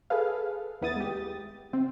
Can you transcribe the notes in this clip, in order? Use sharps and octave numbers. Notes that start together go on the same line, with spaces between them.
G#4 A4 B4 F5
D#2 B3 E4 D#6 A6
G#3 G4
C3 C4